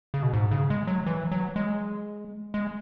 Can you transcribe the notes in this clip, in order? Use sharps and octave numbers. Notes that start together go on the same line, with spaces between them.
C#3
B2
G#2
C#3
G#3
F#3
E3
F#3
G#3
G#3